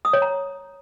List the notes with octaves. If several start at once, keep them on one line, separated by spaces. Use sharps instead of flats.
D#6
C#5
A#5